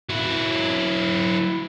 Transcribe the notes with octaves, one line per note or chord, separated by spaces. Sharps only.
F#3 E4